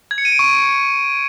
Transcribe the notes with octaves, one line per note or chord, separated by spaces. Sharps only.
G#6
C#7
D#7
D7
C#6